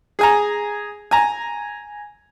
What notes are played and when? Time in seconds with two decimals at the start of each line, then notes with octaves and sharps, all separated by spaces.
0.19 G#4 G#5 A#5
1.11 G#5 A#5